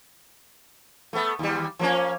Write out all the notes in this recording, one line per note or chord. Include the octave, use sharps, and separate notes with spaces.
A3 B3
D#2 G3
F3 A#3 C#4